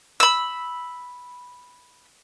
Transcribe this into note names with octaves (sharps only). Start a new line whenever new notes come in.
B5 E6